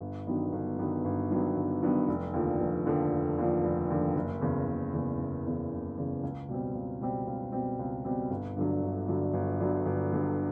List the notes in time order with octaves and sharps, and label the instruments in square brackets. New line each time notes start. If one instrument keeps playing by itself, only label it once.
[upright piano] G1
G2 D#3 F#3 B3
G1
G2 D#3 F#3 B3
G1
G2 D#3 F#3 B3
G1
G2 D#3 F#3 B3
F1
D#2 D3 F3
F1
D#2 D3 F3
F1
D#2 D3 F3
F1
D#2 D3 F3
F#1
E2 C#3
F#1
E2 C#3
F#1
E2 C#3
F#1
E2 C#3
C#2
B2 G3 C4
C#2
B2 G3 C4
C#2
B2 G3 C4
C#2
B2 G3 C4
G1
G2 D3 F#3
G1
G2 D3 F#3
G1
G2 D3 F#3
G1
G2 D3 F#3